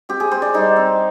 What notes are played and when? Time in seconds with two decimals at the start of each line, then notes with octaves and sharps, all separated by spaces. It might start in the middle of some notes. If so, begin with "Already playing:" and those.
0.09 C4 G4
0.20 G#4
0.32 C4 C5
0.42 D5
0.54 G3 D#4
0.76 C4